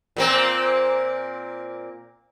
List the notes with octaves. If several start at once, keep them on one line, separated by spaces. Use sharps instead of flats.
A#2 A#3 C4